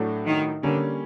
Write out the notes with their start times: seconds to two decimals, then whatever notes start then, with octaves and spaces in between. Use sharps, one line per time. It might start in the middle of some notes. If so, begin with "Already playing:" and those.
Already playing: A2 F#3 A3 D4 F#4
0.26 D#3
0.63 D3 G3 A#3 C#4